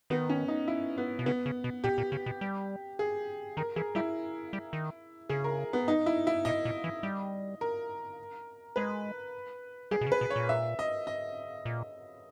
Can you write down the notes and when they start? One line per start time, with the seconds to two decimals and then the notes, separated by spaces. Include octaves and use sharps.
0.10 D#3 B3
0.30 C#4
0.48 D#4
0.68 E4
0.98 B3
1.19 B2
1.26 C#3 B3
1.46 C#3
1.64 B2
1.84 A#2 G4
1.98 A#2
2.12 C#3
2.26 B2
2.41 G3
2.99 G#4
3.57 D#3 A#4
3.76 E3 G#4
3.95 G3 E4
4.53 G3
4.73 D#3
5.29 C#3 G#4
5.44 A#4
5.73 B3
5.88 D#4
6.06 E4
6.27 E4
6.45 A#2 D#5
6.65 A#2
6.84 E3
7.03 G3
7.61 A#4
8.76 G#3 B4
9.91 G3 G#4
10.01 B2
10.07 C#3
10.12 B4
10.21 B2
10.30 C#5
10.36 A#2
10.49 E5
10.79 D#5
11.07 D#5
11.65 A#2